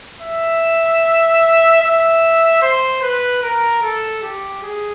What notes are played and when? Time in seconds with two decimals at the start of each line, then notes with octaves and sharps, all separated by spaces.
0.22 E5
1.82 E5
2.62 C5
3.02 B4
3.43 A#4
3.82 A4
4.22 G4
4.63 G#4